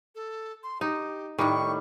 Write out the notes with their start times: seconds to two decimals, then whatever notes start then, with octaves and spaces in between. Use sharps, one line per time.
0.15 A4
0.63 C6
0.81 D#4 G4
1.39 A2 D#3 G3 C#6